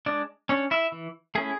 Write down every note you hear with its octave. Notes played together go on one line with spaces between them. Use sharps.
G#3 D4 D5
C#4 D4 C#5
E4 E5
E3
A3 C#4 E4 G#4